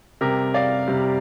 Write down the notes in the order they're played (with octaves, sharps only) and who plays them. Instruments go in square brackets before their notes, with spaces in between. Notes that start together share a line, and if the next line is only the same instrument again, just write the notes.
[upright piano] C3 G3 G4 A#4
D5 F5
C3 G3